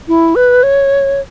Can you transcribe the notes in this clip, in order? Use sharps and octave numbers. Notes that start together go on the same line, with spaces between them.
E4
B4
C#5